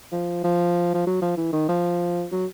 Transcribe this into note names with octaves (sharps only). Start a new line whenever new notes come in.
F3
F3
F3
F#3
F3
E3
D#3
F3
F#3